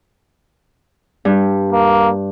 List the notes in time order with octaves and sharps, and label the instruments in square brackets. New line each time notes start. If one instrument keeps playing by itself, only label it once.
[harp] G2
[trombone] A#3